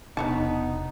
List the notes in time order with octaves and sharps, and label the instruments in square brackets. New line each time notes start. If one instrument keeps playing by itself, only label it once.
[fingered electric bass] E1 C3 D4 [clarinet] B3 [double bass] D#4 [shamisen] B4 C#5 A5